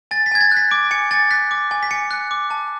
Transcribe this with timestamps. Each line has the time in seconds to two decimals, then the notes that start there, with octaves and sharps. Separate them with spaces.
0.11 G#5 A6
0.26 B6
0.31 G#5 G#6
0.41 A6
0.51 F#6
0.57 B6
0.71 D6 D7
0.91 G#5 C#7
1.11 G#5 A6
1.31 F#6 B6
1.51 D6
1.71 G#5
1.83 B6
1.91 G#5 C#7
2.11 F#6
2.31 D6
2.50 A5